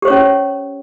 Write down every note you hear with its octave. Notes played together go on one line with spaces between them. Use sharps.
C#4 G4 C5 C#5